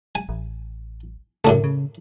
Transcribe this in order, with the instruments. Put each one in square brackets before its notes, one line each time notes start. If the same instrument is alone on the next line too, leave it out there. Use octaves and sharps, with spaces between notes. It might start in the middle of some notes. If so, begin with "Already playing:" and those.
[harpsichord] G#5
[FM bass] A1
[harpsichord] F#2 A2 A3 [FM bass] C#3
[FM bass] C#3